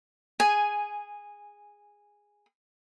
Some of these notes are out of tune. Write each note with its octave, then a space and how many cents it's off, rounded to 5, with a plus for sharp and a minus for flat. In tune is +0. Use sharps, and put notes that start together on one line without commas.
G#4 -10 G#5 +0